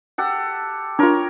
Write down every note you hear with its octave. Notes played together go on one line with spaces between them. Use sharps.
G4 A4 F#5
D4 F4 A#4 C#5